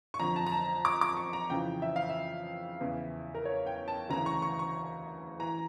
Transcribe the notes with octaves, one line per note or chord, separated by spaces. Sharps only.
C#6
F2 D3 A#5
A5
A#5
A5
D6
D6
C#6
A#5
F2 C#3 E3 G5
E5
F5
E5
E2 C#3 E3
A#4
C#5
G5
A5
D2 C#3 E3 A#5
C#6
C#6
C#6
E3 A#5